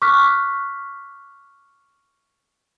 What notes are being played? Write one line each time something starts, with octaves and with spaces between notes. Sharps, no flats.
C#6 D6 F6 F#6 B6